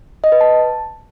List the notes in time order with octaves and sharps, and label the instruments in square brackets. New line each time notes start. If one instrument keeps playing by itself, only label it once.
[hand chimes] D#5
B4
A5